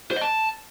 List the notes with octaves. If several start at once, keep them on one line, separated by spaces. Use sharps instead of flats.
C5
D#5
A5